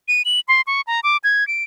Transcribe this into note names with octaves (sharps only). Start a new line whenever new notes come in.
D#7
F#7
C6
C#6
A#5
D6
G#6
D7